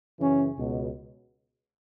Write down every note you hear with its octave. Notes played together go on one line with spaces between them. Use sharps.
F#2 C#3 E3 C#4
C#2 B2